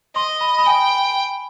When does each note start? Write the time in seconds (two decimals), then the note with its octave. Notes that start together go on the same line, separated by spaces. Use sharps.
0.15 D#5 C6
0.41 B5
0.58 B5
0.66 G5 G#5